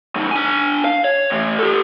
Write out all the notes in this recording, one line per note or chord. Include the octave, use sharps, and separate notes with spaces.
F#2 D#3
D4 G#5
F5
C#5
A2 E3
G4 A4